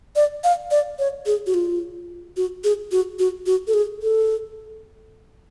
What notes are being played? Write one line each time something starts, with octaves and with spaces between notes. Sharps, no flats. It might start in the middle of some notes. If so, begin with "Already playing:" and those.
D5
F5
D5
C#5
G#4
F#4
F4
F#4
G#4
F#4
F#4
F#4
A4
G#4
A4